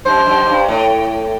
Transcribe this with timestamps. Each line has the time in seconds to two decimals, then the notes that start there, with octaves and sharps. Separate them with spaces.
0.05 F#2 C5
0.26 F#2
0.48 G2
0.68 A2